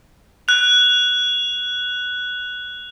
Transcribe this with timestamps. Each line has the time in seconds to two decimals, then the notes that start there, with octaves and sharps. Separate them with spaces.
0.48 F#6 F7